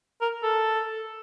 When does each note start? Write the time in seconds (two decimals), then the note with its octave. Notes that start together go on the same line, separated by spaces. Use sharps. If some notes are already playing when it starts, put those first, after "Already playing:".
0.21 A#4
0.43 A4